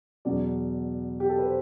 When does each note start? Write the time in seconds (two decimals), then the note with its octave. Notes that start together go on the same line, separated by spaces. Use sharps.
0.25 E2 B2 F#3 D5
1.20 G4
1.29 A4
1.39 B4
1.46 C5